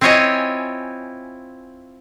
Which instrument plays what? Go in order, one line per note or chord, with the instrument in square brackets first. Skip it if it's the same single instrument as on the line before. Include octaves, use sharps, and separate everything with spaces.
[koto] C4 E4 F4 C#5 D#5 G#5